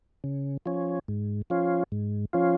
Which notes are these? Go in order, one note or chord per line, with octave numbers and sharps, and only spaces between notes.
C#3
F3 C#4
G#2
F3 C#4 F4
G#2
F3 C#4 F4